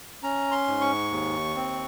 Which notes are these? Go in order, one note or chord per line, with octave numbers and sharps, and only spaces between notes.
C#4 A#5
C6
G#2
C#6
D#2
C4